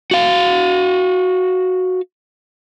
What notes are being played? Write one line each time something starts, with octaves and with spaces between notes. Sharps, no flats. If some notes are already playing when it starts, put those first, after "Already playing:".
F#4 F5